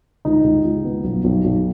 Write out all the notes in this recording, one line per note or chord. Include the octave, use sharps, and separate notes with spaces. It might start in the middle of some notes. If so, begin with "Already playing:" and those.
C#2 D#4
C#2
C#2
B3
B1
B1
B1